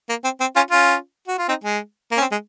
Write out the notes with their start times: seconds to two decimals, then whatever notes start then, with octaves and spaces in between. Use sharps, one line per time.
0.09 A#3
0.24 C4
0.41 C4
0.56 C#4 F4
0.71 C#4 F4
1.28 F#4
1.38 F4
1.49 C4 D#4
1.64 G#3
2.12 A#3
2.17 C#4
2.21 C4
2.32 G#3